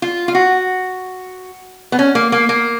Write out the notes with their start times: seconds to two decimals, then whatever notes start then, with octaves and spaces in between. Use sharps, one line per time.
0.02 F4
0.28 F4
0.35 F#4
1.92 B3
1.99 C#4
2.15 A#3
2.32 A#3
2.49 A#3